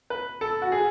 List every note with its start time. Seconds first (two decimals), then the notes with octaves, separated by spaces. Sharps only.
0.10 B4
0.41 A4
0.62 F#4
0.72 G#4